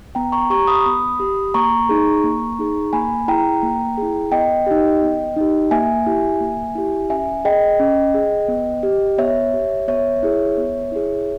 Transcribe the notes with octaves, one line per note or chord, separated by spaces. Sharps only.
B3 G5 A#5
A#5 C#6
G4 A#5 C#6
B5 D#6
B3
G4
A#3 A#5 C#6
D#4 G#4
A#3
D#4 G#4
A#3 G#5 B5
E4 G#4 G5 A#5
A#3
E4 G#4
B3 D#5 G5
D#4 G4
B3
D#4 G4
A#3 E5 G#5
E4 G4
A#3
E4 G4
C#4 E5 G#5
G#4 D#5 G5
C#4
G#4
B3
G4
B3 C#5 E5
G4
B3 C#5 E5
E4 G#4
B3
E4 G#4